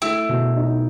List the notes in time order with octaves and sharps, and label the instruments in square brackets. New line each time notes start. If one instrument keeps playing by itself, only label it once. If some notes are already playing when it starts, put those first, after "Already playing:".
[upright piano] A3 [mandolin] E4
[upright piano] B2
D#4